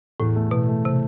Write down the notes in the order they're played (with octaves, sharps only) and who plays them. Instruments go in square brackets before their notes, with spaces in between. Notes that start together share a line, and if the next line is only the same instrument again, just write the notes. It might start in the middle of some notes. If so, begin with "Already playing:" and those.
[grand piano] E2 [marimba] A2
[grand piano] A3
[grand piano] E2 [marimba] B2
[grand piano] A3
[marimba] C3